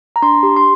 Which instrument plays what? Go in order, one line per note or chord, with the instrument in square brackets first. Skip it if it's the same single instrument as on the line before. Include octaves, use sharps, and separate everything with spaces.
[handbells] A#5
D4 C6
G4
C6